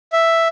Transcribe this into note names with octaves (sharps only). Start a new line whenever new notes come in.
E5